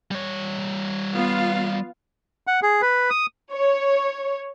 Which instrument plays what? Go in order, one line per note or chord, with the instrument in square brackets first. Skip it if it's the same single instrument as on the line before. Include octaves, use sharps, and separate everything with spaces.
[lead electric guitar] G3 C#5
[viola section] B3 F4 F5
[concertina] F#5
G#4
B4
D#6
[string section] C#5